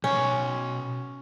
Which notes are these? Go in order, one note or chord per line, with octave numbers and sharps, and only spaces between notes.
B2 C#4 C#5